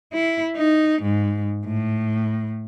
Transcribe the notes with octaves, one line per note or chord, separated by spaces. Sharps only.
E4
D#4
G#2
A2